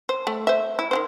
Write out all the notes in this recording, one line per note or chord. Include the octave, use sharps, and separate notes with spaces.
C5
A3
C5 E5
E4
D#3 E3 C5